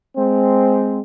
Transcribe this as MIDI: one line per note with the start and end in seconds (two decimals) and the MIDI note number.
0.16 0.99 56
0.16 0.99 60